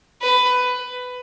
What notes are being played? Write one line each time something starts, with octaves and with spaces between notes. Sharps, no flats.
B4